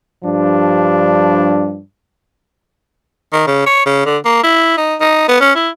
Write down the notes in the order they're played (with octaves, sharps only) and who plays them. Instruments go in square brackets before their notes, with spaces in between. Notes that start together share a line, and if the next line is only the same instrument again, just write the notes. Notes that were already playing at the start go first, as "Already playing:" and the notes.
[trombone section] G2 F3 G3 D4
[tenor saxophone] D#3
C#3
C#5
C#3
D3
A#3
E4
D#4
D#4
B3
C#4
E4